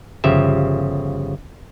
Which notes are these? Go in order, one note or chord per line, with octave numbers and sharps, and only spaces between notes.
G1 C#3 F3 G4 E5